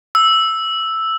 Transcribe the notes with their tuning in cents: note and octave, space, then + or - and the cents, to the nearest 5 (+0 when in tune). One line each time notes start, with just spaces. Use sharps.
E6 +0